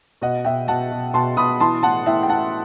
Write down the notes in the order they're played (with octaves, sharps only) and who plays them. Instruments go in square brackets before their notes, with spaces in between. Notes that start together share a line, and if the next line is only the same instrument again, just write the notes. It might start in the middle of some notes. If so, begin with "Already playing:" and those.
[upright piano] B2 D#5 F#5
B2 E5 G5
B2 F#5 A5
B2
B2 A5 C6
B2 B5 D#6
E3 A5 C6
A2 F#5 A5
A2 E5 G5
G5
A2 F#5 A5